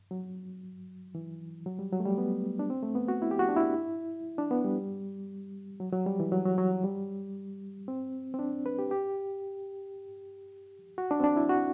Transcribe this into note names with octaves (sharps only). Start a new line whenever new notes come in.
F#3
E3
F#3
G3
F#3
A3
G3
B3
D4
C4
A3
B3
F#4
E4
G4
F#4
D4
E4
D4
B3
G3
F#3
F#3
G3
E3
F#3
F#3
F#3
G3
C4
C4
D4
B4
G4
G4
F#4
D4
C4
D4
E4
F#4